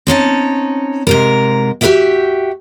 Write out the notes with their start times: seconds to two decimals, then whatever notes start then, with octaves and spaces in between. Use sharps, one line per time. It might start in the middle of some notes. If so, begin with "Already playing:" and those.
0.07 C4 C#4 D#4 A5
1.07 G#2 C3 A#4
1.81 F#4 G4 A#4 C5 E5 G5